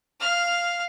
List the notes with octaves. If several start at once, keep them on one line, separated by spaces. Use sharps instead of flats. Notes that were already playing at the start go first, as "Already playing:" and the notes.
F5 F6